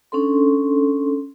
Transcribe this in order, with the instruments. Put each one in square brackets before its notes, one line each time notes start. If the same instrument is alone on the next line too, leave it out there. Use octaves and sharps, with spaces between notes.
[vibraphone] C#4 D4 A4 C6